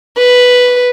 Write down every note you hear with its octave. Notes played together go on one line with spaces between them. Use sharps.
B4